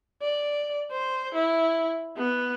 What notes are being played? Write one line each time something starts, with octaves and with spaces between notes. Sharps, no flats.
D5
C5
E4
B3